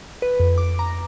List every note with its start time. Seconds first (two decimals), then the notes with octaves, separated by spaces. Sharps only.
0.22 B4
0.40 F2
0.58 D6
0.79 A#5